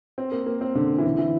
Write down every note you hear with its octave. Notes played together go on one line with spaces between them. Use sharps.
C4
A#3
A#3
C4
D3
E3
D3
E3